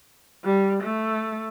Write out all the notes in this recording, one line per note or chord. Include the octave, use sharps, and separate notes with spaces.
G3
A3